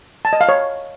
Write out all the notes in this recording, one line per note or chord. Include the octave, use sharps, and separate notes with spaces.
A5
D#5
F5
C#5